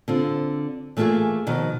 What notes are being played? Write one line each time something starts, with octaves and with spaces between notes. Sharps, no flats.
D3 C4 F4
E3 A3 A#3 E4 F4 G#4
B2 D#3 F3